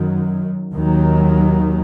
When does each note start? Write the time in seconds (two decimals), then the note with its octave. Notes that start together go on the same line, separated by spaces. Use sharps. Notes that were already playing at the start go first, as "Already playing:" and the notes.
Already playing: F#2 D#3 F#3
0.74 D#2 D#3 F#3